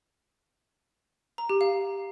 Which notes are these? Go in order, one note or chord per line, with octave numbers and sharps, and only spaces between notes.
A#5
G4
F5